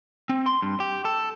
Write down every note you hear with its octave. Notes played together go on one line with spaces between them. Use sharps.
C4
C6
G2
G4
A4